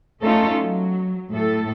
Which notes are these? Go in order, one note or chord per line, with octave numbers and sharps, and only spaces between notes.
A3 C#4 D#4 F4 A4
F#3
A2 A4